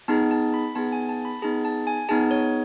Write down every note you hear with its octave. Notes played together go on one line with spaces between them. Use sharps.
B3 D#4 G#4 A5
A5
B5
B3 D#4 G#4 A5
G#5
A5
B5
B3 D#4 G#4 A5
A5
G#5
B3 D#4 G#4 A5
C#5